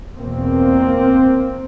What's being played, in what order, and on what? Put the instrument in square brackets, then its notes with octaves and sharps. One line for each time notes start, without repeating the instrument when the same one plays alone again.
[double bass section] E2 B2 A#3 C4